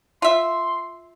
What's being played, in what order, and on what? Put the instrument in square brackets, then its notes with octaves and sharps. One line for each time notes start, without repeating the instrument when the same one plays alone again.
[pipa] F4 E5 [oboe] C6